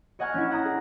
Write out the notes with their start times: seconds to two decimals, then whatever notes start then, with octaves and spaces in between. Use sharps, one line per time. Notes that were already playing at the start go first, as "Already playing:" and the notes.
0.19 C#5 D#5 F#5 G#5 C#6 F6
0.34 C#4 D4 E4
0.51 F#5 G5 A#5 D#6
0.65 G#4